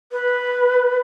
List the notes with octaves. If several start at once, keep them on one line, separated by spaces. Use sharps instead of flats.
B4